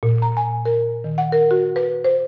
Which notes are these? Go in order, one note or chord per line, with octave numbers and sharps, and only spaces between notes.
A#2
A#5
G#5
A#4
D#3
F#5
A#4
F#4
B4
C5